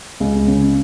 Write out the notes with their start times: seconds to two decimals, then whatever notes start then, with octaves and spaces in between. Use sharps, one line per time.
0.20 C#2
0.48 C#3